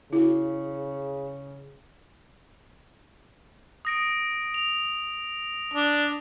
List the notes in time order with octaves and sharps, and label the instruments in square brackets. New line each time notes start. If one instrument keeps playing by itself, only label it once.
[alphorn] C#3 [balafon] E4 F#4
[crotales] D#6 A#6 D7
F7
[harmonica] D4